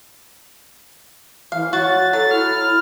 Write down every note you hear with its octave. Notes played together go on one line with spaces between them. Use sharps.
E3 F5
F#4 C#5 A6
F#3 A4 A6
E4 F6